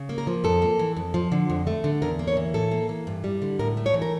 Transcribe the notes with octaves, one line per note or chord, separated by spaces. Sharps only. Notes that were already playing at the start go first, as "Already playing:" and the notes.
Already playing: C#3
A#3
A#4
F3
F2 A4
A#3
E3
F2
F3
D3
F2
A3
D3
E2 A#4
A#3
C#5
E3
A2 A4
A#3
E3
G2
G3
D3
A2 A#4
A3
C#5
E3
A#4